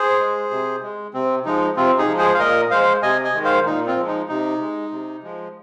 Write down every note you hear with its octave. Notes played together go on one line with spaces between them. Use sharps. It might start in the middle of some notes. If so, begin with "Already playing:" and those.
Already playing: G#4 C5
G#3
C3
G#3
C3 C4
F3 G#3 D#4
C3 C4 F4
D#4 G#4
F3 G#3
G#4 C5
F5
A#2 A#4 D#5
G#3 C5 F5
C3 D#5 G#5
D#5 G#5
D#3 G#3
C5 F5
A#2 D#4
C4 F4
F3 G#3
D#4
C3 D#4
G#3
C3
F3 G#3